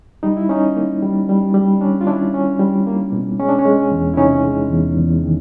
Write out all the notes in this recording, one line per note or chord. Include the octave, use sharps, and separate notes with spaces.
G3 D#4
E4
C#4 D#4
A#3
G3
G3
G3
C#4 D4
F4
C#4 D4 E4
C#4
G3
A#3
B2
G#3 C#4
D4
C#4
G#3
E2
E4
C3 C#4 D#4
G#3
E2
E2
D#3